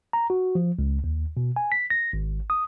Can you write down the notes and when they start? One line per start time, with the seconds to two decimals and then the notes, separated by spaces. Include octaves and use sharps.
0.13 A#5
0.30 F#4
0.55 F3
0.79 C#2
1.04 D#2
1.37 B2
1.56 G#5
1.72 B6
1.90 A#6
2.13 G#1
2.50 D#6